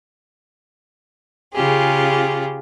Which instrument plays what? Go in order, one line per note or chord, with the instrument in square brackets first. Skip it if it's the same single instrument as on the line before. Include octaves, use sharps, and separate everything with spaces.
[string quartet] C#3 F4 G4 G#4